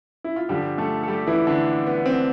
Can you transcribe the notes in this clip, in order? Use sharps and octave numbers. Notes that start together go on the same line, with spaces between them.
E4
F4
G2 D3 F3 G3 G4
A3 A4
A4
G3 G4
E3 E4
D3 D4
B3
C4